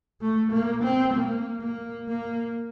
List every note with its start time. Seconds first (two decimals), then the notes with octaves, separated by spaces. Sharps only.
0.21 A3
0.52 A#3
0.83 C4
1.14 A#3
1.62 A#3
2.08 A#3